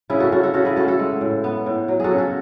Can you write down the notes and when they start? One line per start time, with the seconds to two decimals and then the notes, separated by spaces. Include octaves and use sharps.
0.10 C#3 E4 G#4
0.20 F#4 A4
0.32 C#3 F#4 A4
0.43 F#4 A4
0.54 C#3 F#4 A4
0.65 E4 G#4
0.76 A3 F#4 A4
0.88 F#4 A4
0.99 G#3
1.21 A2
1.44 B3
1.66 A2
1.88 F#3
2.00 F#4 G#4 A4
2.11 C#3
2.18 F#4 A4